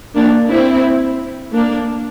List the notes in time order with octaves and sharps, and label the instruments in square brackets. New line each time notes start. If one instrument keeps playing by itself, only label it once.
[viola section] A#3 D4
C4 E4
A#3 D4